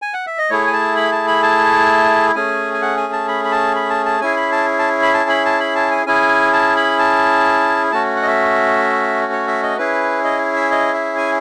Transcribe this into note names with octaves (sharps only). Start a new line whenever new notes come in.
G#5
F#5
E5
D#5
A3 E4 G#4 C#5
G#5
A5
B5
A5
B5
A5
A3 C#4 G#4 G#5
G#5
F#5
G#5
A5
B5
B5
A5
B5
A5
A5
C#4 E4 G#4 G#5
B5
A5
A5
B5
A5
B5
A5
B5
A5
G#5
C#4 E4 G#4 G#5
A5
B5
A5
A3 C#4 F#4 A5
F#5
D#5
E5
C#5
E5
D#5
C#4 E4 G#4 B4
D#5
E5
D#5
E5
G#5